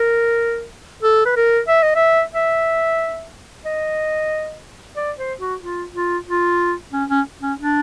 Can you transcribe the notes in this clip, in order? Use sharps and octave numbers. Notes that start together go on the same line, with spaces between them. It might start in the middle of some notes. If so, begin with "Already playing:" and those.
Already playing: A#4
A4
B4
A#4
E5
D#5
E5
E5
D#5
D5
C5
F#4
F4
F4
F4
C#4
C#4
C#4
D4